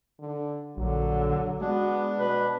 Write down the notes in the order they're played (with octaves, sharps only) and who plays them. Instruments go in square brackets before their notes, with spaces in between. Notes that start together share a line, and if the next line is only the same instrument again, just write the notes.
[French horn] D3
[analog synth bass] A#1 [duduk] D3 [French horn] F#3
[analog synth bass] G#3 [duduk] B3 [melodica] D4 [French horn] F#4
[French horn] B2 [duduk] B4